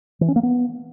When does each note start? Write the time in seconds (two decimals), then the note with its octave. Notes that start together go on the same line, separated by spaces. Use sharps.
0.21 E3
0.28 C#4
0.36 A#3
0.43 B3